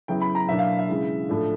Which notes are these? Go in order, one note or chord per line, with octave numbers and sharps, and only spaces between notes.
C#3 F#3 B3 E4 G5
B5
A#5
B2 F#3 A#3 D4 E5
F5
E5
C#3 E3 G#3
A2 F3 A3 D4